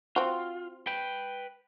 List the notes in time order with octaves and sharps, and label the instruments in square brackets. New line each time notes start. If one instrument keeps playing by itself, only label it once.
[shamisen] C4 F#4 [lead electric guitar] F4
[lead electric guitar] B4 G5